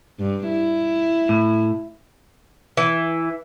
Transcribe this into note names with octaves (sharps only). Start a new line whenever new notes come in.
G2
E4
A2
E3 E5